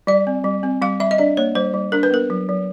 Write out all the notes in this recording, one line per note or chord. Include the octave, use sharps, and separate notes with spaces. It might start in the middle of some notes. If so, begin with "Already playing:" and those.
G3 D5
C4
G3
C4
G3 F5
G3 E5
D#5
D4 D5
A#3 C#5
G3 C5
G3
D4 A#4
B4
B3 A#4
F#3
F#3